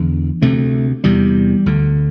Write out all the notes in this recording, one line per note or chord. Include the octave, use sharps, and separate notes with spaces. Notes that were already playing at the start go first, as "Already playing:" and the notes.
Already playing: E2 D3
D2 C3 A3
E2 C3 G3
D2 D3